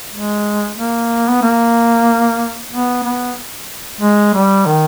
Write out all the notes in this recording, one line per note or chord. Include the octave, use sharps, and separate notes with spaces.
G#3
A#3
B3
A#3
B3
B3
G#3
G3
D#3